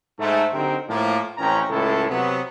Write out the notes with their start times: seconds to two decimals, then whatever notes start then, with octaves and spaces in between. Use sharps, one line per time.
0.19 G#2 A3
0.53 D3 F#3 C4 D#4 G4 A#4
0.89 A2 F3 A#3
1.38 A1 F2 C#4 G5 A#5
1.69 C#2 A2 A4
2.09 C3 F#3 B3